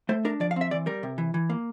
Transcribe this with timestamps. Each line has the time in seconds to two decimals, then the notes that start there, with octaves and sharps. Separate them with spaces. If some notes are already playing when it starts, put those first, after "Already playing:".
0.09 A3 C5
0.25 D4 A#4
0.40 F3 D5
0.51 F5
0.56 C4 E5
0.71 E3 D5
0.86 G3 A#4
1.03 C3
1.18 E3
1.34 E3
1.50 A#3